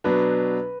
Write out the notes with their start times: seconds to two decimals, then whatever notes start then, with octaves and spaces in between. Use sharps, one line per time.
0.04 B2 F#3 D4 B4